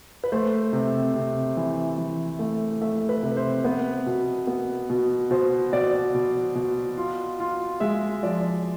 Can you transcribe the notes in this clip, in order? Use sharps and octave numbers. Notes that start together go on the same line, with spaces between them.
B4
A3 C5
C3
C3
E3
E3
A3
A3 E5
B4
C3
C5
B3 B4
B2
B3
B2
B2 C5
B2 D5
B2
B2
F4
F4
G#3 E5
F3 D5